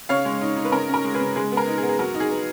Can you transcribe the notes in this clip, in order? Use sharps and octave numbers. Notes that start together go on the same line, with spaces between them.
C#3 C#5 F5
G#3
D#4
D#4
B4
C#3 A#4
C#4
A#4
G#3
G#4 B4
C#3
G#3 G#4
B3
A#4
D#4
G#4
B3
G#4
F#3 A#4
D#4
G#4
B3